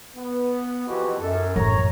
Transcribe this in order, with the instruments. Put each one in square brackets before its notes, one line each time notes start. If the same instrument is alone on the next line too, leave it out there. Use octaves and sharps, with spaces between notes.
[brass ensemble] B3
[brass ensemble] F2 B2 E3 [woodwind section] F#4 G4 B4
[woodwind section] F#2 [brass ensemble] A4
[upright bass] A1 F#2 [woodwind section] C#5 [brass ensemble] A#5